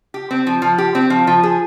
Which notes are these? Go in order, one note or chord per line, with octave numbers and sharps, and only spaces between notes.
G4
C4
F3
F3
G4
C4
F3
F3
G#4